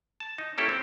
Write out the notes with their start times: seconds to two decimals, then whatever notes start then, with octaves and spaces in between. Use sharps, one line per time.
0.20 A5
0.38 D#4
0.58 A#3 C#4 E4 G4 A4
0.69 C4